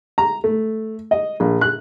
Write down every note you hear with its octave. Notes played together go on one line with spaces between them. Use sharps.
A#5
A3
D#5
A#1
F#6